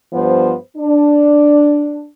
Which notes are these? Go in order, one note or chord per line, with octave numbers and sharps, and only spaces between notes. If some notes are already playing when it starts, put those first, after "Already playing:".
G2 F3 B3 C5
D4